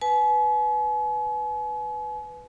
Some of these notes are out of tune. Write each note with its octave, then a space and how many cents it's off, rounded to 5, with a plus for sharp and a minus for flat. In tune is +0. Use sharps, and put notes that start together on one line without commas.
B4 +5 G#5 +40